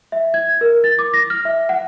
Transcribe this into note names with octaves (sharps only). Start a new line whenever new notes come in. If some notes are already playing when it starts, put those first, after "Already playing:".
E5
G#6
A#4
A6
D6
A#6
F6
E5
F#5